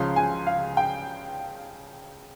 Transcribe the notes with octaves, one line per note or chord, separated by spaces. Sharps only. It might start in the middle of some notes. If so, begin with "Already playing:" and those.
Already playing: C#2 C#3 F3 C6
G#5
F5
G5